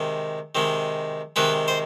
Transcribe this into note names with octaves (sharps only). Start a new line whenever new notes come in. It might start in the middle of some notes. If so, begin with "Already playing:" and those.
Already playing: C3 D#3 G#3
C3 D#3 G#3
C3 D#3 G#3 B4
C5